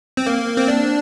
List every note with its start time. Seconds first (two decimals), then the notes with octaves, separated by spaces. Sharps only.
0.17 C4
0.26 A#3
0.57 C4
0.68 D4